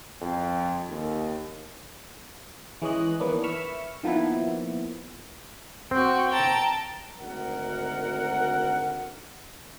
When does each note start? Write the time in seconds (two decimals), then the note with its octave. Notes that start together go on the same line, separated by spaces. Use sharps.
0.22 F2
0.90 D#2
2.82 E3 G#3 C#4 C#5 D#5 F#6
3.20 D#3 E3 A#3 B3 C#4 D4
3.44 E5 B5 C#6 E6 F6
4.03 D#3 F3 A#3 B3 E4
5.91 C4 F#4 G5
6.29 G5 A5 A#5
7.19 G#1 D2 A#4 F#5